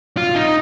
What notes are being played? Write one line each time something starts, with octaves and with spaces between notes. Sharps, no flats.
F4
D#4